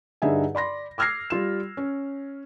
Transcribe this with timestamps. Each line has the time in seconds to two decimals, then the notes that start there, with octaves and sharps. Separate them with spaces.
0.22 G2 D3 D#4 G#4 E5 G#5
0.55 D5 B5 C6 A#6
0.98 D6 E6 F6 G#6 A#6 C7
1.30 G3 F4 E7
1.77 C#4